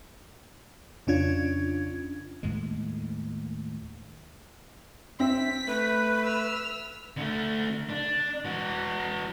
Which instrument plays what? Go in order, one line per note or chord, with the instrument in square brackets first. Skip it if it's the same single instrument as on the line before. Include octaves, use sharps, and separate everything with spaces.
[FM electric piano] F2 C#3 C#4 D4 F4 G#6
[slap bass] D#2 A2 G#3
[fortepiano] C4 E5 [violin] B6
[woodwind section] A3 [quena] B4
[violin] E6 F6
[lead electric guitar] D3 A3
D4
E3 F#4